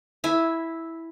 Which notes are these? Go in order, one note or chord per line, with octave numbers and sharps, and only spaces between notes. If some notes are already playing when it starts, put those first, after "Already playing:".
E4 E5 G#5